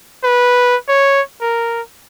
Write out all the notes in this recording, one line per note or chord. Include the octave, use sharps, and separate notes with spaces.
B4
C#5
A#4